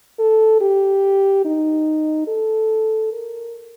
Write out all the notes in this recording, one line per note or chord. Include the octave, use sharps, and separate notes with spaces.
A4
G4
D#4
A4
A#4